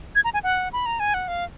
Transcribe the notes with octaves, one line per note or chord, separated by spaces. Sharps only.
G#6
A#5
G#5
F#5
B5
A#5
G#5
F#5
F5